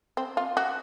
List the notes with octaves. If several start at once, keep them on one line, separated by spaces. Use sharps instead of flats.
C4
F4
F#4